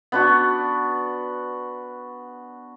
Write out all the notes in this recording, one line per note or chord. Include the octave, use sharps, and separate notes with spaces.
B3 D4 F#4